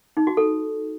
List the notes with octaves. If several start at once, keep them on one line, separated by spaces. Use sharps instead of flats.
D#4
F#4
A4